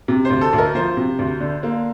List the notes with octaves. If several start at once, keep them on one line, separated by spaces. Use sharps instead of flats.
C3
C5
D2
A4
D2
A#4
F3 C5
C3
D2
D3
A#3